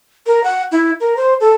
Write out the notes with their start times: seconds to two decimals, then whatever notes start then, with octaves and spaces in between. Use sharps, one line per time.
0.26 A#4
0.44 F#5
0.72 E4
1.00 A#4
1.17 C5
1.40 A4